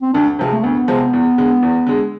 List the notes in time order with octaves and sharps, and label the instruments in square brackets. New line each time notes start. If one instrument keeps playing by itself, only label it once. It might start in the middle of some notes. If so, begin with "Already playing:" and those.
[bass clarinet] C4
[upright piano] D2 [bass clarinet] D4
[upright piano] C3 F3 G#3
[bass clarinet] A3
[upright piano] D2 [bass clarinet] B3
[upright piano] C3 F3 G#3
E2
D3 G#3
E2
D3 G#3